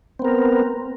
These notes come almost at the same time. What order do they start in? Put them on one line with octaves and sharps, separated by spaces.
C4 B3 A#4